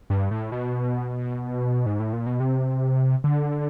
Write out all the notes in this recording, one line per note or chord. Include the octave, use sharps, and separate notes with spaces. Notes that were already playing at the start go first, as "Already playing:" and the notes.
G2
A2
B2
G#2
A2
A#2
B2
C3
D3